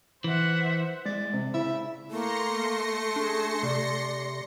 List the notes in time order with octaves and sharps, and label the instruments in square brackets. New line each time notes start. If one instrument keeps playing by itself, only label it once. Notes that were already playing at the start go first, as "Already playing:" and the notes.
[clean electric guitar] E3 [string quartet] C5 E5 F#5
[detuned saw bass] G#3 [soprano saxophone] D5
[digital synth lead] C3
[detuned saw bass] C#3 [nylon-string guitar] E4 [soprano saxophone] E5 [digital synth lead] B5
[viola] A3 [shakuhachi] A#3 [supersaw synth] C6 A#6 C#7
[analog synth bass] D4 [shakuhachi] G#4
[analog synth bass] C3 [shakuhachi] D5